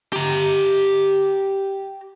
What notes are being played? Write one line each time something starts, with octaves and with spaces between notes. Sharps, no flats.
G4 A#5